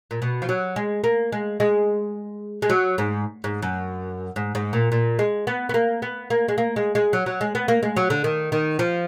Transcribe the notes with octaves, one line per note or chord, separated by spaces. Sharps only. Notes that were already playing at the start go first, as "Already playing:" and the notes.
A#2
B2
F3
F#3
G#3
A#3
G#3
G#3
G#3
F#3
G#2
G#2
F#2
G#2
G#2
A#2
A#2
G#3
B3
B3
A#3
B3
A#3
G#3
A#3
G#3
G#3
F#3
F#3
G#3
B3
A#3
G#3
F#3
D3
D#3
D#3
F3